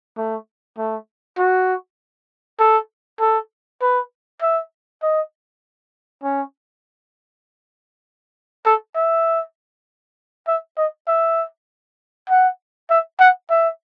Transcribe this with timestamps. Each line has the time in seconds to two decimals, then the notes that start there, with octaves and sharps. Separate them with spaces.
0.17 A3
0.78 A3
1.38 F#4
2.60 A4
3.20 A4
3.82 B4
4.42 E5
5.03 D#5
6.23 C#4
8.66 A4
8.95 E5
10.48 E5
10.77 D#5
11.08 E5
12.30 F#5
12.90 E5
13.20 F#5
13.50 E5